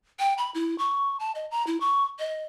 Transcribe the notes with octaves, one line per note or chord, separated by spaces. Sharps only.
G5
B5
E4
C#6
A5
D#5
A#5
E4
C#6
D#5